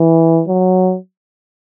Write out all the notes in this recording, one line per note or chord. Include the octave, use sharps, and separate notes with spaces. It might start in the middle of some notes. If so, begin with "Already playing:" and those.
Already playing: E3
F#3